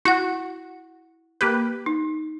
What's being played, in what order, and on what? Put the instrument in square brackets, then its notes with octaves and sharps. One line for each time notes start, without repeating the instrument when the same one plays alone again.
[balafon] E4 F#5 [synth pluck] F#4
[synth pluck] A#3 G4 B4
[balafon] D#4